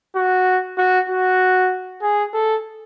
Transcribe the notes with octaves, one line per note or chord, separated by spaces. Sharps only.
F#4
F#4
F#4
G#4
A4